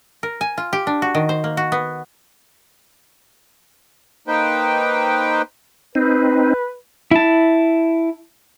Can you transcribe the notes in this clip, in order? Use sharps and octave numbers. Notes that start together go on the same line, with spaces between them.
A#4
G#5
F4
G4
D4
F#4
D#3
C5
A#3
F#4
B3
A#3 D#4 B4 C5 G5
C4 D#4 B4
E4 A5